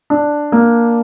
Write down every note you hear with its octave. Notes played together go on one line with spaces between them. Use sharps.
D4
A#3